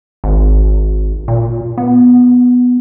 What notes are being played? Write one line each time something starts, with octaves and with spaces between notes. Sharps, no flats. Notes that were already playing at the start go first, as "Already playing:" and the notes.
G#1
A#2
B3